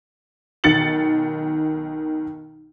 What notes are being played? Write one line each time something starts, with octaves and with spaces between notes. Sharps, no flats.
B1 D#3 A6 C#7 F#7